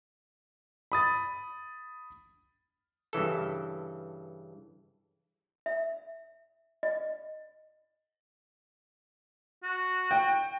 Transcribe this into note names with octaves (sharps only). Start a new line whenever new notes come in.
B5 D#6 A6
G2 C#3 E3 A4
E5
D#5
F#4
G5